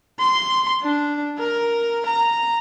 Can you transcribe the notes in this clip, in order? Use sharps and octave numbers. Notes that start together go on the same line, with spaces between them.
C6
D4
A#4
A#5